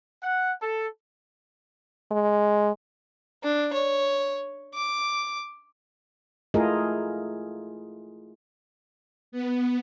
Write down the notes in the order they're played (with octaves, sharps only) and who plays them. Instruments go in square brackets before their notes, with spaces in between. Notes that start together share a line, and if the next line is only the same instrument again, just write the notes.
[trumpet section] F#5
A4
[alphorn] G#3
[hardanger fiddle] D4
C#5
D6
[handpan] A3 E4 F4 G#4 A#4 D#5
[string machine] B3